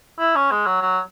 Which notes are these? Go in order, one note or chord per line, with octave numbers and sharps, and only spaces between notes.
E4
C#4
G#3
F#3
F#3